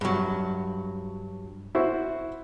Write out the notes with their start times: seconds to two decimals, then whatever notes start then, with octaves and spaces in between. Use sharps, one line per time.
0.01 G2 F#3
1.75 E4 F#4 C5